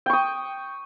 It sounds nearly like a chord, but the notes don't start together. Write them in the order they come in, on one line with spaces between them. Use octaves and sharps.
G5 C#6 D#6